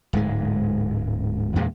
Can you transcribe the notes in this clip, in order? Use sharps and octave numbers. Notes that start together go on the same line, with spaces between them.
D1 G#2 G#3
E2 A#2 G#3